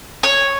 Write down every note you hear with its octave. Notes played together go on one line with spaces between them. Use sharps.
C#5